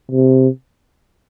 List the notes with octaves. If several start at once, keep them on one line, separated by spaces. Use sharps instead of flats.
C3